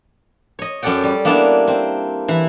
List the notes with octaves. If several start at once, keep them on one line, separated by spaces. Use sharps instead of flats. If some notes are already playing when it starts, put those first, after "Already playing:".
C#5 D#5
F#2 C#4 A4 D5 F#5 G5
G3
A#3 B3 D4 E4 A5
C4
E3 E4